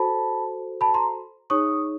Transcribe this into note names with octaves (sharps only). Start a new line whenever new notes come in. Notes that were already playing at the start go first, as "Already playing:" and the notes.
Already playing: F#4 A4 C5 A5 B5
A5 B5
A#5 C6
D#4 G#4 C#5 C#6 D#6